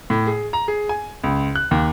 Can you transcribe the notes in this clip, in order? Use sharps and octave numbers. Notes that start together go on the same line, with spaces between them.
A2
G#4
A#5
G#4
G#5
C#2
F#6
D#2